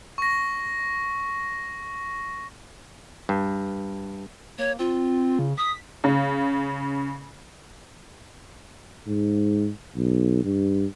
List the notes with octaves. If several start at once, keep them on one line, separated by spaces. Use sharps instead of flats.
C#6 A#6
G2
A#3 C#5
C4 F4
C#3
D#6 B6
C#3
G#2
B1
G2